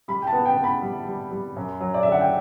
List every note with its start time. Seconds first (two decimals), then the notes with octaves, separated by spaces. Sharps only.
0.08 G3 B5
0.22 G5
0.27 A5
0.33 B3
0.45 G5
0.57 B3
0.64 B5
0.82 G3
1.07 G3
1.31 G3
1.56 F#2
1.80 F#3
1.94 D5
2.03 D3 E5
2.12 F#5
2.21 G5